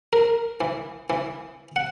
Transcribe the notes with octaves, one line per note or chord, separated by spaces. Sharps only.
A#4
E3
E3
F#5